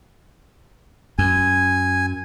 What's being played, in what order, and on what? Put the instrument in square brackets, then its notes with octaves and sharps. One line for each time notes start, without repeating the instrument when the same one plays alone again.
[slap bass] F#2 [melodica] G#5